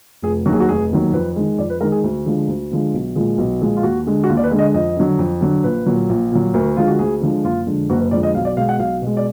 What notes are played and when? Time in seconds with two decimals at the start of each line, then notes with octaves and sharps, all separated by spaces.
0.22 F1 G#4
0.46 D#2 D#3 F#3 F#4
0.53 G#4
0.60 F#4
0.68 F1 G#4
0.91 D#2 D#3 F#3
1.13 F2 B4
1.36 D#3 G#3
1.58 F2 D5
1.70 B4
1.81 D#3 G#3 A#4
1.92 G#4
2.04 D2
2.26 D3 F3 G#3
2.48 D2
2.71 D3 F3 G#3
2.94 B1
3.16 A#2 F3 G#3
3.38 B1
3.61 A#2 F3 G#3
3.77 F4
3.83 D#2 F#4
4.06 D3 G#3
4.24 F#4
4.29 D#2 F4
4.37 D5
4.44 B4
4.51 D3 G#3
4.59 D#5
4.74 F2 D#5
4.97 D3 F#3
5.19 F2
5.41 D3 F#3
5.64 A#1 B4
5.86 A#2 F#3
6.09 A#1
6.32 A#2 F#3
6.54 D2 A#4
6.77 D3 F3 G#3 F4
6.88 F#4
6.99 D2 G#4
7.21 D3 F3 G#3
7.44 F#1 F4
7.66 F2 D3 G#3
7.90 F#1 F#4
8.00 B4
8.11 F2 D3 G#3 D5
8.23 D#5
8.35 B1 F5
8.45 D5
8.57 B2 G#3 F5
8.69 F#5
8.79 B1 F5
9.02 B2 G#3
9.17 D5